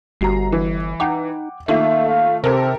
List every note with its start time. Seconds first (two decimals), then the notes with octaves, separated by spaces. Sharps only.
0.21 G1 G3 F#4 A#5 C7
0.52 E3
1.00 D#4 F#5 G5 D6
1.68 D#3 A3 A#3 F4 E5
2.09 F5
2.44 C3 C4 G4 A4 A#4